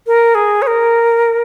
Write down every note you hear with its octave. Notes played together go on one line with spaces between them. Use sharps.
A#4
G#4
C#5
A#4